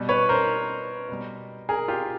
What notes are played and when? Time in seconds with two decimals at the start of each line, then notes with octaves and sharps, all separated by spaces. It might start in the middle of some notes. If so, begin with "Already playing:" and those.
Already playing: B2 G3
0.09 B4 C#5
0.29 A#4 C5
1.08 B2 G3
1.69 G#4 A#4
1.88 F4 G4